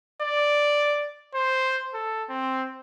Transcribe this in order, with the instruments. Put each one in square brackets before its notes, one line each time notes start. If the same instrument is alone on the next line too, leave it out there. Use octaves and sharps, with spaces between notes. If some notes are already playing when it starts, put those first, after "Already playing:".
[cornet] D5
C5
A4
C4